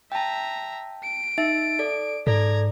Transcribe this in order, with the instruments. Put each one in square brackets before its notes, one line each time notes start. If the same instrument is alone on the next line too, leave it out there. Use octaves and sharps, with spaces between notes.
[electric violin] E5 A#5 [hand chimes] G5 A5
[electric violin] D7
[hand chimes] D#4 E5 A6
A4 D5
[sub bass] G#2 [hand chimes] A4 D5 [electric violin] A#5 G#6